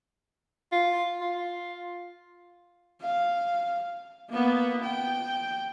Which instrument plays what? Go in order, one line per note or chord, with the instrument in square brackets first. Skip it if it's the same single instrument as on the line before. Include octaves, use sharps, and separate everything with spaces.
[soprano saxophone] F4
F4
[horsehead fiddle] F5
A#3 B3
G5